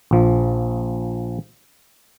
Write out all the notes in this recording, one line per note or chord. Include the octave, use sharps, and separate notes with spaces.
A#1 F3